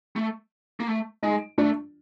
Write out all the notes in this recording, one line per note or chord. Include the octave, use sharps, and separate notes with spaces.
A3
A#3
A3
G#3 D#4
A3 D4